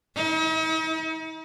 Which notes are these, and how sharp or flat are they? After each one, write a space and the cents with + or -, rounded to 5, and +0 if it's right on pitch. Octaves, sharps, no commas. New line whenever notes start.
D#4 +45